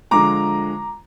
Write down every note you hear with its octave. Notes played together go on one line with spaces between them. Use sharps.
D3 F3 G#3 A#5 D6